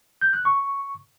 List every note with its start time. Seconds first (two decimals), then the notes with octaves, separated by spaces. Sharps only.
0.21 G6
0.33 F#6
0.45 C#6